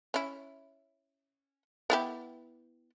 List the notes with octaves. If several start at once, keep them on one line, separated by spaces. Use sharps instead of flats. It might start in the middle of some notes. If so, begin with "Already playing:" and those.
C#4 E4
B3 E4 G4